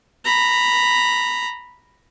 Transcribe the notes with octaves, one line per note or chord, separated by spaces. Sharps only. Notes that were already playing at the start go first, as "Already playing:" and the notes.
A#5 B5